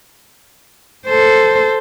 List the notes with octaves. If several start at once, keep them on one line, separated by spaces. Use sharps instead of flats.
A4 C5